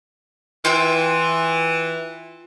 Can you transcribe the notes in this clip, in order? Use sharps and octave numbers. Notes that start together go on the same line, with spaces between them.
E3 F4 G5 E6